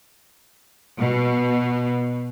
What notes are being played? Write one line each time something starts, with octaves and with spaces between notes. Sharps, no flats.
B2